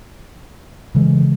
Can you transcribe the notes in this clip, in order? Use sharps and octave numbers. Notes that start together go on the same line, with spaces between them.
C#3 E3 G#3